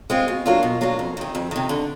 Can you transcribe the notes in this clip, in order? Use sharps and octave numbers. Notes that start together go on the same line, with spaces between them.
G#3 C4 F4
B2
F#3 A#3 D4 F4
B2
F#3 A#3 D4 F4
F2
C3 D#3
F2
C3 D#3
D3